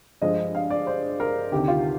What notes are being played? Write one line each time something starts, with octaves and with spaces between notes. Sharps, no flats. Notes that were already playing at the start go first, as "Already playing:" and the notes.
G2 F3 G#3 D#5
F5
D5
C5
A#4
D2 C3 D#3 G4
F4